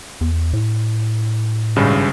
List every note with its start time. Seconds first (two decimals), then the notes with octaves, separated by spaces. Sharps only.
0.21 E2
0.53 A2
1.76 G#1 G2 C#3